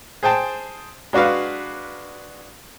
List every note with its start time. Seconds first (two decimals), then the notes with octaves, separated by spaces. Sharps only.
0.23 G#4 C5 G5 A5
1.13 G#3 D4 F#4 B4 F5